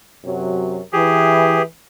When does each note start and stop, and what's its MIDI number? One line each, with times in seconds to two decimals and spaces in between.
0.24 0.78 42
0.24 0.78 48
0.24 0.78 54
0.93 1.61 52
0.93 1.62 67
0.93 1.62 68